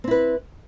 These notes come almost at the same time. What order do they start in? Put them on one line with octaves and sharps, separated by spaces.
C4 E4 B4